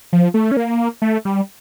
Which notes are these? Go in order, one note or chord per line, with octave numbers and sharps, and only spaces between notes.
F3
A3
C#4
A#3
A3
G3